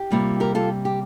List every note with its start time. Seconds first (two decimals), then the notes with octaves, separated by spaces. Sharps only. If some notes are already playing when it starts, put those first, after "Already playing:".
Already playing: G4
0.11 C3 G3 A#3 F4
0.40 G4 A#4
0.55 F4 A4
0.85 G4